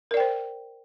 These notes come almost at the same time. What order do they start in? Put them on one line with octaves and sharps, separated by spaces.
A#4 D5 G5 C5